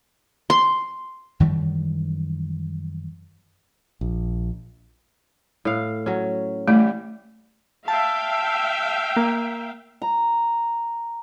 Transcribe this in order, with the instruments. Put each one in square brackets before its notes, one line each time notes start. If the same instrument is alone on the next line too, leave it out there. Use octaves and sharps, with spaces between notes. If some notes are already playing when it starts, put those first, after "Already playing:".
[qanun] C6
[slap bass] F#2 D#3 E3 G3
[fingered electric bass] A#1
[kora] A2 F5
F#3 C#4
[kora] E3 G3 [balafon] A3
[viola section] E5 F5 G5 [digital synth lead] A5
[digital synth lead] A#3
[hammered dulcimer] A#5